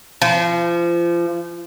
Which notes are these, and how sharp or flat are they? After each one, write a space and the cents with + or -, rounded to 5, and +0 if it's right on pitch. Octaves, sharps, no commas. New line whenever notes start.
F3 -30